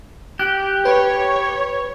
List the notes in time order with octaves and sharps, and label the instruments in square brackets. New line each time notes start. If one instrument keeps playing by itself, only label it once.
[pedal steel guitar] G4 [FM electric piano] F#6
[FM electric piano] B4 [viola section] C#5